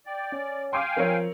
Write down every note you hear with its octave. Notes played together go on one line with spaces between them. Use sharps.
D5 G5
C#4
F5 G5 G#5 C6 D6
F3 C4 A#4 C#5